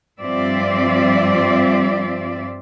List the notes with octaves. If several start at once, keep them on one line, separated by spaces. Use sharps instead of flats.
G2 F3 C4 F4 D5 E5